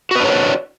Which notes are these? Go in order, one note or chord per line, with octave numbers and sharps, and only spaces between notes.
D4 F#4 B4 C#5 D5